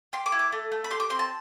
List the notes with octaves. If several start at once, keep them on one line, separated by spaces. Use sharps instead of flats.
G4 C6
D6
E4
D6
A3
A3
B5
G4 C6
D6
C4 C6
A5